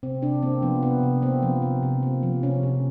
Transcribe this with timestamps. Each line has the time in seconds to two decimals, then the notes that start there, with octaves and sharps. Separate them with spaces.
0.03 C3 C4
0.22 C3 D4
0.42 A#3 C4
0.62 F3 B3
0.82 C3 B3
1.03 C3
1.22 A#3 C4
1.43 F3
1.62 C3
1.83 C3
2.03 A#3
2.23 F3
2.43 C3 C#4
2.63 C3